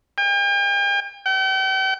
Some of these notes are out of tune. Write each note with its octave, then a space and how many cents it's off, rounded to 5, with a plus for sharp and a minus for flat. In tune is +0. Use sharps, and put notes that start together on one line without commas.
G5 +45
G5 -40